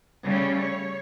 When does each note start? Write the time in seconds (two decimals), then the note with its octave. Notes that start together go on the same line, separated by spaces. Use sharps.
0.24 C#3 G3 A3 C#4
0.59 C#5